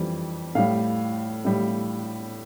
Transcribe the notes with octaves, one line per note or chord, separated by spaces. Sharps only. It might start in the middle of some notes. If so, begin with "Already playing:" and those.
Already playing: F2 E3 G3
A2 G3 F5
A2 G3